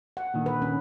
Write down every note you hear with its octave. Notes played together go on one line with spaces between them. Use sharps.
F#5
A#2 D3 D#3
B4
C#4